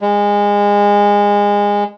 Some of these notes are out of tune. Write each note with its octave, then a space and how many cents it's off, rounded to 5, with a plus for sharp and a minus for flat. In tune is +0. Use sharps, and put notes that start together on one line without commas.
G#3 -25